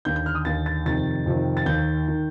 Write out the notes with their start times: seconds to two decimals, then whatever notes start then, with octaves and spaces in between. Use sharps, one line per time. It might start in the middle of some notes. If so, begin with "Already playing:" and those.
0.05 D#2 D3 G6
0.16 G6
0.26 F6
0.35 D#6
0.45 D#2 D3 A6
0.66 A6
0.86 F2 C3 D#3 A6
1.26 F2 C3 D#3
1.57 A6
1.66 D#2 D#3 G6
2.08 D#3